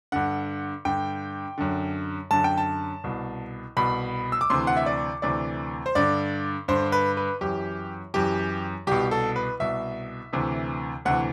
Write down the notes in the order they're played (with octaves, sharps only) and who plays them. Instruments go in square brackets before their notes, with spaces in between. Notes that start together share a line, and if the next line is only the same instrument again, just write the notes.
[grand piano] G2 D3 F#5
G2 D3 G5
F#2 D3
F#2 D3 A5
G5
A5
C2 B2
C2 B2 B5
E6
D6
D2 C3 E3 C6
F#5
E5
D5
D2 C3 E3 D5
C5
G2 D3 D5
G2 D3 C5
B4
B4
F#2 E3 G4
F#2 E3 G4
C2 B2 G4
A4
B4
C2 B2 E5
D2 C3 E3
D2 C3 E3 F#5